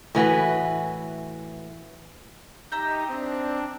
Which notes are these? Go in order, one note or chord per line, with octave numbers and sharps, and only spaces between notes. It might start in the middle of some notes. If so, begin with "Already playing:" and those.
A2 E3 F#4 B4
D#4 G4 E5 A#5 G6
C4 D4